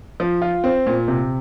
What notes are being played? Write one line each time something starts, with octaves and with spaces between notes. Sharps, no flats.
F3
F4
C4
A#2
C3